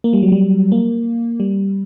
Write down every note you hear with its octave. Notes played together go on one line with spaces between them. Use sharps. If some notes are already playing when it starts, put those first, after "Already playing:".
A#3
G3
F#3
G3
A#3
G3